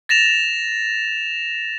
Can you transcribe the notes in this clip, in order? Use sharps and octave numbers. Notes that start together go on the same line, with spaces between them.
A6 A#6 E7 F7